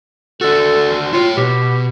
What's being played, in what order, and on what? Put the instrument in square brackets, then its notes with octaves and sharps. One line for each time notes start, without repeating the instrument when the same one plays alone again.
[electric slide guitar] D4 F#4 [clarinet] A4
[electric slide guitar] E4 C#5 [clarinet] F4
[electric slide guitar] B2 [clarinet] G4